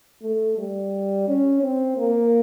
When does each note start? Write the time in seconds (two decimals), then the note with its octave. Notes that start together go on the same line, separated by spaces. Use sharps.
0.22 A3
0.58 G3
1.28 C#4
1.63 C4
1.98 A#3